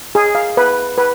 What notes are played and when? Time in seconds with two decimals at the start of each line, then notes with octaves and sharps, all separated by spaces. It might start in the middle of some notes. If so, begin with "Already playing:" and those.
0.15 G#4
0.35 F5
0.57 B4
0.98 B4